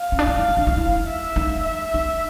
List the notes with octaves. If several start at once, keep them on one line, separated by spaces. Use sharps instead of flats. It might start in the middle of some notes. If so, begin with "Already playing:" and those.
Already playing: F5
C#4
D4
D#4
E4
D#4
D4
D#4
E4
E5
D#4
E5
D#4